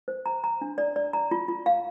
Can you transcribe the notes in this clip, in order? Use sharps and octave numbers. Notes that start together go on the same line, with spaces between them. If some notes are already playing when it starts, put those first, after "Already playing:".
C5
A#5
A#5
D4
D5
D5
A#5
F4
F4
F5